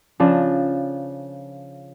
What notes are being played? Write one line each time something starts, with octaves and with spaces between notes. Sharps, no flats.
C#3 F3 D4